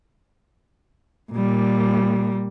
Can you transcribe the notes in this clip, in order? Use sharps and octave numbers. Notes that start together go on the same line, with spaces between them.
A#2 G3